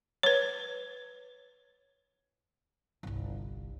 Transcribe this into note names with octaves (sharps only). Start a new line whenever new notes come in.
B4 C#5
G1 C2